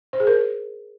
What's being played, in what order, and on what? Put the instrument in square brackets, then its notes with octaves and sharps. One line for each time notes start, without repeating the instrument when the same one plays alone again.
[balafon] C5
G#4
A#4